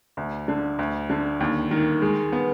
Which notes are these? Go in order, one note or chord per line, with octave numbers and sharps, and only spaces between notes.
D2
D3
D2
D3
D#2
D#3
G#3
B3